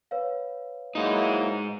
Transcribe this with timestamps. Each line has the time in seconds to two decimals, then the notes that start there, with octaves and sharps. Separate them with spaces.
0.11 B4 C#5 F5
0.95 G#2 F#3 A#3 D#4 E4